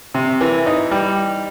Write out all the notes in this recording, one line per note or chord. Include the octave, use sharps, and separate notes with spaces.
C3
E3
D#4
G3